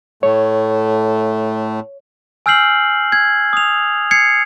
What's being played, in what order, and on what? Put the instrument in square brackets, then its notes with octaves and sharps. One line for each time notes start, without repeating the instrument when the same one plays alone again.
[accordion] A2 A3 [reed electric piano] C#5
[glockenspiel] G#5 E6 F6 G6 C7 F#7
G#6
D#6 F7
G#6 C7 C#7